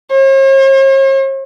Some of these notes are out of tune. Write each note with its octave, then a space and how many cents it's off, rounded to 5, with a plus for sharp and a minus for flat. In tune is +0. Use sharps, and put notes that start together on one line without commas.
C#5 -45